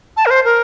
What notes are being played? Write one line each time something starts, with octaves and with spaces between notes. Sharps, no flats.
A5
A#4
C5
A#4